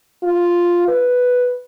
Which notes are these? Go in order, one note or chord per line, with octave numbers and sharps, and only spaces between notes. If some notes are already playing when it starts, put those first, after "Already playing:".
F4
B4